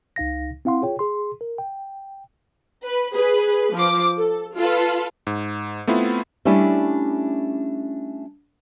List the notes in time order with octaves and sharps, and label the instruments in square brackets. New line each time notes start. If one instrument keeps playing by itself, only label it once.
[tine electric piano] C#2 D#4 F5 A#6
C4 E4 F5 F#5 C6
F4 G#4 C#5 G5
G#4 C6
A#4
G5
[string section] B4
G#4 B4
F3 D6
A4
F4 A4 B4
[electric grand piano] G#2
A3 B3 C4 E4 F4
[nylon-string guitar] G3 A3 C#4 D4 E4